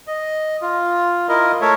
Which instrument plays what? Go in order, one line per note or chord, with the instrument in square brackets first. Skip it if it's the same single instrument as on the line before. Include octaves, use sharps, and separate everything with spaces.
[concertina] D#5
F4
E4 F4 A#4 D#5
A3 A4 A#4 C#5 E5